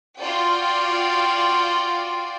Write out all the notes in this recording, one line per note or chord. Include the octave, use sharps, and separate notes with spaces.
F4 F#4 D5 G5